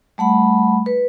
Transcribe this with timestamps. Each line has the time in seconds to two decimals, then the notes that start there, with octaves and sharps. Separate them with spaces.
0.18 G3 A3 F#5 B5
0.86 B4